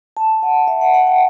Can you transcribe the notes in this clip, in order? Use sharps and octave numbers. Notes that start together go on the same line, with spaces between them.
A5
F#5
E5
F#5
F#5
G5